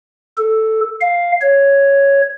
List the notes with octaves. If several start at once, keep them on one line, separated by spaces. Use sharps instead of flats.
A4
F5
C#5